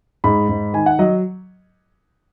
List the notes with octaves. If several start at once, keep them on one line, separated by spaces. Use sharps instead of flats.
G#2 B5
G#2
D#3 G#5
F#5
F#3 D#5